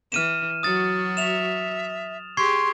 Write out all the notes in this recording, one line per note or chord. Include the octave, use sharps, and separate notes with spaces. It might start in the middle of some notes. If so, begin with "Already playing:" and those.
E3 F6 D#7 E7
F#3 F#4 D#6 A6
E5 E7 F7
G4 G#4 C6 C#6 G#6 C7